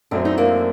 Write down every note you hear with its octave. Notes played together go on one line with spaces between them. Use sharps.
F#2 F#3 A3 C4 D4
D#4
A#3 D4